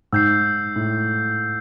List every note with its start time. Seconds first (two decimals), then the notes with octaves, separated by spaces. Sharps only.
0.13 G#2 E6 G6 C7
0.76 A2